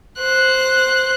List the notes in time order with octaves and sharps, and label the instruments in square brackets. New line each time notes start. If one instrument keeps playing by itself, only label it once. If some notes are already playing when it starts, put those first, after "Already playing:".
[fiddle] C5 F#6